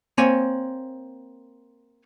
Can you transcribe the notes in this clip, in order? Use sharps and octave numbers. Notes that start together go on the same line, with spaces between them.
A#3 C4 C#5 G#5